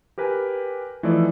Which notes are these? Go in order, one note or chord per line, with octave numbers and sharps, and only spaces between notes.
G4 A#4 B4 G5 G#5
E3 F3 A3 D#4 A4 D5